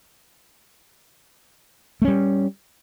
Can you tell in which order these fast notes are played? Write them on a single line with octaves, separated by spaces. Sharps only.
A3 C#4 G3